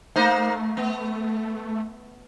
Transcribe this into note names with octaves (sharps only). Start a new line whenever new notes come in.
A3 A#3 D#4 C5
B3